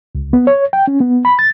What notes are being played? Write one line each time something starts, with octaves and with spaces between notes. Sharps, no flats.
C#2
B3
C#5
G5
C#4
B3
B5
A6